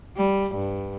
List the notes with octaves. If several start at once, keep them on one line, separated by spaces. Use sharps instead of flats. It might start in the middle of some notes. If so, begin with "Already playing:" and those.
G3
G2